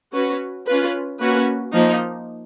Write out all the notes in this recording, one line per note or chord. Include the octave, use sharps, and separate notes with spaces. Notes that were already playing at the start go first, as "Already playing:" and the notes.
C#4 F#4 B4
C#4 F4 B4
A#3 C#4 F#4 B4
F3 A#3 D#4